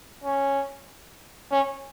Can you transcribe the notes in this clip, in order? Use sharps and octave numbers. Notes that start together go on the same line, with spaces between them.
C#4
C#4